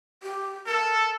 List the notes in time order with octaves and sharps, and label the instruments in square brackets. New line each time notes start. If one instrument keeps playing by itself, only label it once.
[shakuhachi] G4
[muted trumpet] A4 [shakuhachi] A#4